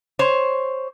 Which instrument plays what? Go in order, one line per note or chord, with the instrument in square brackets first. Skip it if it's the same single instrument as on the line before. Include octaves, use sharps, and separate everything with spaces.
[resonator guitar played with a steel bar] C5 C#5